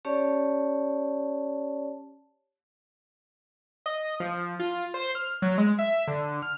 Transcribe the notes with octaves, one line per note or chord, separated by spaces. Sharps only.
C#4 G4 C#5 D5 A5
D#5
F3
F4
C5
F6
F#3
G#3
E5
D3
F6